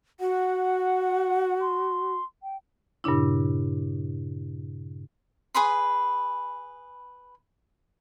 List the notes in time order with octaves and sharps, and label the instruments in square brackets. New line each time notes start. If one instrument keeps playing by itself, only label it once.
[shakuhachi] F#4 [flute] F#5
[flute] C6
G5
[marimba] G2 A#2 C#3 D4 E4
[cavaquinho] G#4 B4 B5 C6